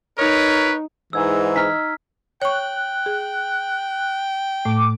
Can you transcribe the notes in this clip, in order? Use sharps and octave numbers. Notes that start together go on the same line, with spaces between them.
D#4 A#4 B4 C#5
G#2 E3 E6 G#6
D#4 E6 F6 B6
C#5 G5 C#6 F#6
G#4
A2 A3 D6